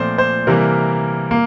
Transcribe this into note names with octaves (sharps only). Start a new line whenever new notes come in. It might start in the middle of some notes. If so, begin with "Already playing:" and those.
Already playing: A#2 F3 A3 C4 C5 D5
C5
C3 E3 G3 A#3 A#4
A#3